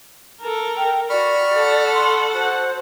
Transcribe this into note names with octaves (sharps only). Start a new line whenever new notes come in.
A4 A#4
G5
F#4 D5 B5 C#6 F6
A4 F#5
C6
F#4 C5